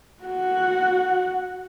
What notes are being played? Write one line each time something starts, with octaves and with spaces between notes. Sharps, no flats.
F#4 F#5